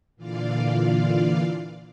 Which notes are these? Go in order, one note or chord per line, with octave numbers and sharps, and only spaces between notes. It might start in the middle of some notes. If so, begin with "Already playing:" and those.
A#2 D3 E3 F4 D5 F5